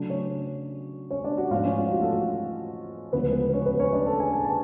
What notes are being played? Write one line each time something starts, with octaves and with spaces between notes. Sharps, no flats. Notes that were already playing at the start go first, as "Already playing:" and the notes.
Already playing: C#3 F#3 A3 D4
C#4 C#5
C#4 C#5
D4 D5
F#4 F#5
G#2 F3 A3 C#4 F4 F5
C#4 C#5
F4
F#4
A3 A4
F#4
D2 C#3 F3 G#3 B3 B4
B3 B4
C#4 C#5
B3 B4
C#4 C#5
D4 D5
A4 A5
G#4 G#5
G#5
A5